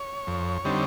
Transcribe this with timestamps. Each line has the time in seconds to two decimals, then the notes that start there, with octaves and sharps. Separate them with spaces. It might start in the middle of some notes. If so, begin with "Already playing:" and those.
Already playing: C#5
0.27 F2
0.65 D3 G3 C4 D#4